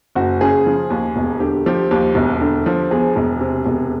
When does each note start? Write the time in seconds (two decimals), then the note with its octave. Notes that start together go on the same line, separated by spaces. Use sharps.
0.15 F#1 F#4
0.41 C#3 G#4
0.66 F3
0.90 D#2
1.16 E1
1.40 D3 G4
1.66 F3 G4
1.91 D#2 G4
2.15 E1
2.41 D3
2.66 F3
2.91 E2 G#4
3.16 E1
3.41 C3
3.66 E1